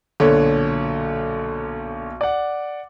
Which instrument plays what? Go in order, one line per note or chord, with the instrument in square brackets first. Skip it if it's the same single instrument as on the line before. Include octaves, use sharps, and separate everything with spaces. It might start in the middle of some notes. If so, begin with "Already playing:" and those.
[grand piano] B1 A#2 C#5 [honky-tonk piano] D3
[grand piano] D5 F#5